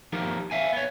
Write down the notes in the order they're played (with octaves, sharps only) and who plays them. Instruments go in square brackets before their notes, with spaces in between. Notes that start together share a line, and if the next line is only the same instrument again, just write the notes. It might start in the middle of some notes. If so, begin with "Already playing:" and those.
[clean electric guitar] F3 D#4 G4 A#4
E5 F5 G#5
B3 C#5